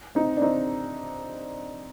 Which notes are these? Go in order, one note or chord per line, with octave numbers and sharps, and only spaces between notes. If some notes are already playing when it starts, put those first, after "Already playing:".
C4 D#4
D4
C4 D#4